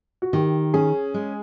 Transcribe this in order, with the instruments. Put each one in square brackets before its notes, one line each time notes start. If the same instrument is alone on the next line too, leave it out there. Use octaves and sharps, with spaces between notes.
[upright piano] F#4
[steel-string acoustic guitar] D#3 [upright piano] G4
[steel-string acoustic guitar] C#4 [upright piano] G#4
[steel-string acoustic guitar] G#3